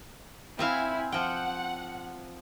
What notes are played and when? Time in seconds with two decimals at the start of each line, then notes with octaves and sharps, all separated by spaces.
0.59 C4 E4 E5 F5 G#5
1.12 F3 F#5 G5